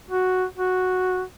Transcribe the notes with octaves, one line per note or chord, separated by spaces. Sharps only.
F#4
F#4